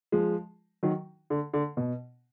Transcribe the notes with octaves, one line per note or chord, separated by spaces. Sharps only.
F3 G#3
D#3 F#3
D3
D3
B2